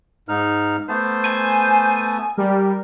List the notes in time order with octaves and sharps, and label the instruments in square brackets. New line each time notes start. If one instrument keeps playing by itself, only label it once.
[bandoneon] G#2 D#4 F6
[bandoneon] A3 B3 A5 [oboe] C5
[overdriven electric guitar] G#5
[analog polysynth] G3 [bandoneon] A#4